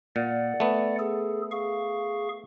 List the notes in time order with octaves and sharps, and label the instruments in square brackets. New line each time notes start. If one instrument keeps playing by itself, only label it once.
[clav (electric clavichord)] A#2 [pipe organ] D5 F#5
[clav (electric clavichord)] A3 B3
[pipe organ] G#4 A4
G#4 F5 C#6